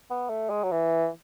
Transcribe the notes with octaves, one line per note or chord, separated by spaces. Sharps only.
B3
A3
G#3
F#3
E3